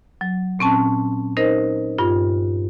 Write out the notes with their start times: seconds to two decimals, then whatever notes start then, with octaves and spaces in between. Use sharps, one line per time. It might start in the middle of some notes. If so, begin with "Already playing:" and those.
0.21 F#3
0.59 A#2 C4 C#4 A5
1.37 D#4 A#4 C5 D#5
1.98 G2 F4